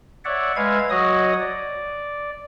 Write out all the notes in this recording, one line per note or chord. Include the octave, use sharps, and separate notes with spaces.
C#5 D5 E5 F#5
G#3 B4 E5 F5 G#6
F#3 F#4 C#5 D#5 D#6
D5